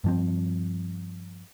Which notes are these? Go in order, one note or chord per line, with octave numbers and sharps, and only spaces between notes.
G2 F3 C4